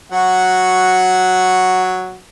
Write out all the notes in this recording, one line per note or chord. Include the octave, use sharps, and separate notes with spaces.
F#3 F#4 F#5